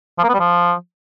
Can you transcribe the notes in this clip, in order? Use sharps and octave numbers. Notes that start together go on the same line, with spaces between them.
F3
A#3
B3
G3
F3